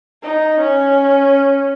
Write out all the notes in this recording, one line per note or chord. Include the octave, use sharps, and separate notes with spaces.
D#4
C#4